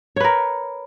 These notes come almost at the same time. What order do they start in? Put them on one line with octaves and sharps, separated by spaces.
C#5 B4 A#4